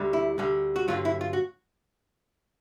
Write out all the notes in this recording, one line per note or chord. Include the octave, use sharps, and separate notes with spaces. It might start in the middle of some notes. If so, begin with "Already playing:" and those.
Already playing: D2 D3 G3
E4
D2 D3 G3
F#4
G2 D3 F#3 F4
E4
F4
F#4